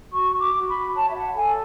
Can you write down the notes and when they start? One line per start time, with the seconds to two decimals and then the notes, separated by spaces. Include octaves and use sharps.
0.12 F#4 C#6
0.39 D6
0.53 F#4
0.67 B5
0.94 C#5 A5
1.08 E5
1.14 F#5
1.35 A4 G#5